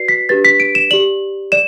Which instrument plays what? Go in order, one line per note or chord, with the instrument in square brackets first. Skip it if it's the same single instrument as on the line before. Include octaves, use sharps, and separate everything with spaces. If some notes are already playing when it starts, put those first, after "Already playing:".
Already playing: [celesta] F#4 B4 D5 C7
B6
D4 G4 B4 A6
B6
D7
E7
G4 D5 F#7
D5 E7